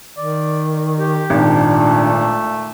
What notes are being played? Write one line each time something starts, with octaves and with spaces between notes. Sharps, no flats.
D#3 D5
G4
G#1 A#2 D4
A3